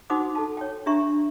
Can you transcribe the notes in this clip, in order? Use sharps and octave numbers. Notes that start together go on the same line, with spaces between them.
D#4 F#4 C5 F#5 D6 D#6
A4 A5
C#5 G5
D4 G4 E5 A#5 C#6